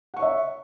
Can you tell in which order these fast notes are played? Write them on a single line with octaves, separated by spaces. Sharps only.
F#5 C#6 C#5 E5